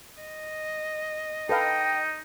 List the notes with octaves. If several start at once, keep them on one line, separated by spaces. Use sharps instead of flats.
D#5
D#4 A4 B4 F5 G5